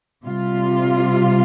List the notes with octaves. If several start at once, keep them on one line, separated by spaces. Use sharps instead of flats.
C3 G3 F4